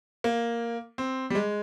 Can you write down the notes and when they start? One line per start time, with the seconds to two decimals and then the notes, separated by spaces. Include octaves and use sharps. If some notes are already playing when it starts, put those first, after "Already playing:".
0.24 A#3
0.98 C4
1.30 G3
1.35 G#3